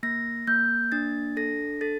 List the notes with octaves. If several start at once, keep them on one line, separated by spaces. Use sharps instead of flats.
A#3 A#6
A#3 G6
D4 A6
A4 A#6
A4 A6